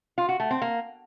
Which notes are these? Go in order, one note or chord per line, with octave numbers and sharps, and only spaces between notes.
F4
F#4
A3
C4
A#3